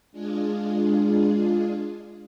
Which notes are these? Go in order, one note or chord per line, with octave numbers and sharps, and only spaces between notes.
G#3 D4 F4 G#4